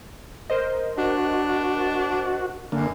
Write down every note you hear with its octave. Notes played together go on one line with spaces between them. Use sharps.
A#4 C5 D#5
D4 F#4
F#2 D3 A#3